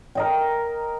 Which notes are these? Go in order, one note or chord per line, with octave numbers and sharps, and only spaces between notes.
A#4 D#5 G5